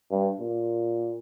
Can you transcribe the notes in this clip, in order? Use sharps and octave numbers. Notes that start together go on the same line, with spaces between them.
G2
A#2